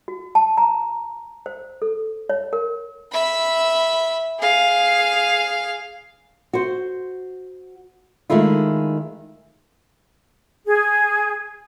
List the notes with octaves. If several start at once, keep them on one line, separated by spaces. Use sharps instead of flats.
F#4
A5
A#5
C5
A4
C#5
A#4
E5 B5
G#4 F5
F#4 C5
D#3 G#3 A3 E4 F4
G#4